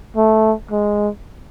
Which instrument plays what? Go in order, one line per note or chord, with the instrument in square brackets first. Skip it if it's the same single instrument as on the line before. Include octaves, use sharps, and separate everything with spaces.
[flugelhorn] A3
G#3